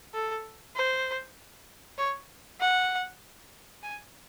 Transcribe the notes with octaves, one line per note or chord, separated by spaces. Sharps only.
A4
C5
C#5
F#5
G#5